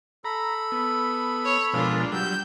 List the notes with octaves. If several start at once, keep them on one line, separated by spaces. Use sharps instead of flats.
A4 A#5 B5
B3
C#5
B2 F3 G#3 D4 F4 A#4
F#3 G3 E6 G6